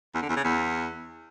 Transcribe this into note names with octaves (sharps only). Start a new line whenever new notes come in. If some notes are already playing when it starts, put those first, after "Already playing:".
E2
D3
E2
C#3
E2